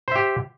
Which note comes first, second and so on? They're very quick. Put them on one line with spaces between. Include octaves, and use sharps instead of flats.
C5 E5 G4